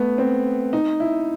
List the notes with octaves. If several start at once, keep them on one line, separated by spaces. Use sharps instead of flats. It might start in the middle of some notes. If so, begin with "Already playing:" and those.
Already playing: A3 B3
C4
D#4
E4